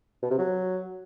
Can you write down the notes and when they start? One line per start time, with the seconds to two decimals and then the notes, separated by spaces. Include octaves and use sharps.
0.23 B2
0.31 C3
0.38 F#3